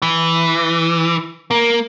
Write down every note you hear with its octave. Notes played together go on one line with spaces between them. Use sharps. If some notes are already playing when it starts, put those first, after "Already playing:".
E3
A#3